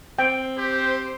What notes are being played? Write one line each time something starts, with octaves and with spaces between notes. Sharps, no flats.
C4 G5
G4 C5